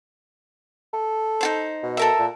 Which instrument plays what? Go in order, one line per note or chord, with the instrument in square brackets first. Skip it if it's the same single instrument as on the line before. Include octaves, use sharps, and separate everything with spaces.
[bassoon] A4
[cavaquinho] D#4 F4 C5
[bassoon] B2
[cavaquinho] A4 A#4 E5
[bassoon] A#2